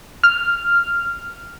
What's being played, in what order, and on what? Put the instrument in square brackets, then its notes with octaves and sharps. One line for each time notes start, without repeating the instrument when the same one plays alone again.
[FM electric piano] F6